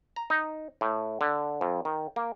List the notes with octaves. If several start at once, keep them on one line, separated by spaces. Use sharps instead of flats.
A#5
D#4
A2
D3
F2
D#3
A#3